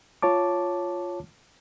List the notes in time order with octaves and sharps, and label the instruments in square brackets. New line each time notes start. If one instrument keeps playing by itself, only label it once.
[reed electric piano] F4 C#5 A5 D6